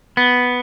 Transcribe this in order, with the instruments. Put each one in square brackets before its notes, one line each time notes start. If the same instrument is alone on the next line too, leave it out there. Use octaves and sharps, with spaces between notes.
[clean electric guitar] B3